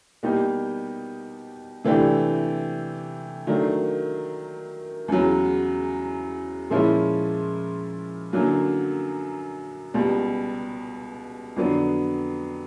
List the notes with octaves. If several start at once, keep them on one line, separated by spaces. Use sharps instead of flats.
B2 G3 A#3 D#4 G4
C3 E3 A3 D4 G4
D#3 F#3 A3 D4
E2 C#3 F#3
A#2 F3 G#3 C#4 E4
F#2 D3 F#3 A#3
C#2 B2 G3
F2 D3 F#3 B3 D4